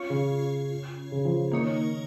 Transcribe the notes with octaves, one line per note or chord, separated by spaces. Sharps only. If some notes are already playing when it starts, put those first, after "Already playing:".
Already playing: C#4 F4 C#5
C#3
C#3
F3
D#3 A#3 D#4 C#5